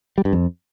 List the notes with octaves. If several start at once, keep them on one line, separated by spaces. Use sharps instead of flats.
G3
G2
F2